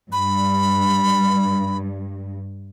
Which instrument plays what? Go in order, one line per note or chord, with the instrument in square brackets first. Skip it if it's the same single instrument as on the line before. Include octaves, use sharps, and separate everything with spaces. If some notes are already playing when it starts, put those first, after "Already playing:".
[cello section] G2 [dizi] B5